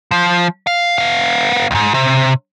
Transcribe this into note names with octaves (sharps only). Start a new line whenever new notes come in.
F3
F5
B3 F5
C#2 G#2
C3